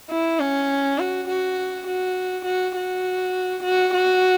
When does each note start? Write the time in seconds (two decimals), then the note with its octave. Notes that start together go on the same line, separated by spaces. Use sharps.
0.10 E4
0.39 C#4
0.99 F#4
1.28 F#4
1.87 F#4
2.45 F#4
2.76 F#4
3.63 F#4
3.94 F#4